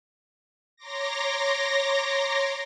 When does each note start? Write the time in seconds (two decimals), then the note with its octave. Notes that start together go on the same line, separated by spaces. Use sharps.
0.76 C#5 A#5 C6 D6 A#6